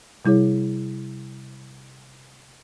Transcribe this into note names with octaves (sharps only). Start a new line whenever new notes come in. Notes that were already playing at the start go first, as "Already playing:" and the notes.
C3 G3 E4 G#4 C#5